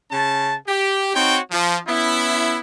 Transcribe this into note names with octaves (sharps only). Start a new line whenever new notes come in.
C#3 C#4 A5
G4
C4 D#4 F#4 C#5 G5
F3
B3 C#4 E4